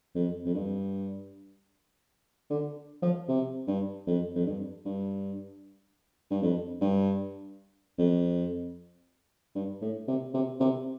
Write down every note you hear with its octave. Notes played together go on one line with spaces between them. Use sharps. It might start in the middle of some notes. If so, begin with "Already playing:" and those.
F2
F2
G2
D3
F3
C3
G2
F2
F2
G2
G2
G2
F2
G2
F2
G2
A2
C3
C3
C3